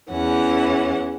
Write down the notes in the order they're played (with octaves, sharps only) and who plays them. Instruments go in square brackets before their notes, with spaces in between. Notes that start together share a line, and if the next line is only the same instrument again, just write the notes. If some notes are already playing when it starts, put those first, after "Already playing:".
[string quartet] E2 E3 C#4 F#5